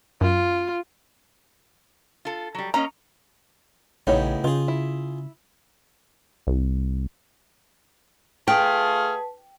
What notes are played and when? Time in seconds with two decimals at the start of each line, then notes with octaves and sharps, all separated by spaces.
0.21 F#2 F4
2.25 F4 A4
2.55 F#3 G3
2.74 A#3 C#4 D#5 A#5
4.07 A#1 A2 C#3 B3 D#4 G4 C#5
4.44 C#3 F4 G#4
4.68 E4
6.47 C2
8.48 A3 F4 G#4 B4 G5 A5 F6